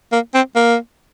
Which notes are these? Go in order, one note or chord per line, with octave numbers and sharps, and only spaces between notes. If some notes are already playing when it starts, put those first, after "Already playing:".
A#3
C4
A#3